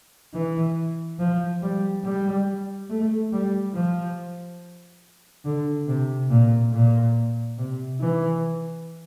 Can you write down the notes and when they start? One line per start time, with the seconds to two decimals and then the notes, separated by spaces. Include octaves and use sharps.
0.34 E3
1.19 F3
1.62 G3
2.04 G3
2.90 A3
3.32 G3
3.75 F3
5.45 D3
5.87 C3
6.30 A#2
6.73 A#2
7.58 C3
8.01 E3